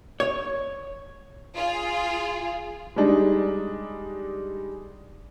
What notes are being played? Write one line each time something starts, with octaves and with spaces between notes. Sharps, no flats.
C#5
F4 G#4
G3 G#3 D4 D#4